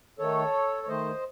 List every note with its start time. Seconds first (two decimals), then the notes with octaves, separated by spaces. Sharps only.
0.19 D#3 A3 A4 C#5
0.83 C#5
0.88 D#3 A3 C5 D#5